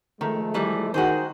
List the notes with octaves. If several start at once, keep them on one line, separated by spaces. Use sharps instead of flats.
D#3 F3 G#3 A3
D#3 E3 G3
D#3 F#4 G#4 C5